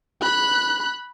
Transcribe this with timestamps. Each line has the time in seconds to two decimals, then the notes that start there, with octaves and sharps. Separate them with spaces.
0.22 B5 F#6